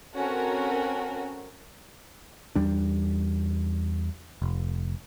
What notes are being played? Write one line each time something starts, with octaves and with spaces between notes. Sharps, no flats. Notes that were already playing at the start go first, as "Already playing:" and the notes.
C4 C#4 F#4 A4 A#4
E2 G3 D4
F1